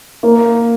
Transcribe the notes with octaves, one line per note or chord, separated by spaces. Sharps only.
A#3